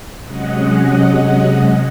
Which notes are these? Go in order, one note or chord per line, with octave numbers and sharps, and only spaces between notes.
C3 F#3 G#3 C#4 D#5 F#5